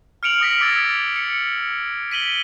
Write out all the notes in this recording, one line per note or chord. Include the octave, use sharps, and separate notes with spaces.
F6 C#7 D7 F7 F#7
D#6 A#6 B6 D7
D6 E6 G#6 A6 D7
C#7
B6 D#7 F#7 G7